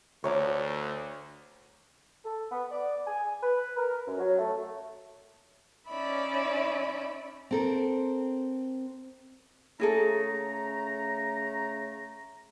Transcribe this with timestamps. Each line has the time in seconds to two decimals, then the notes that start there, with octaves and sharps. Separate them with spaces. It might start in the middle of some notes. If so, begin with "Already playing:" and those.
0.24 D2 C#5 A#5 D6
2.25 A4
2.51 B3
2.70 D5
3.06 G#5
3.42 B4
3.77 A#4
4.07 F#2
4.18 F#3
4.39 A3
5.88 C#4 D#4 D5 E5 B5
7.51 C4 A4 A#4
9.80 C#3 A3 E4 G#4 A4 A#5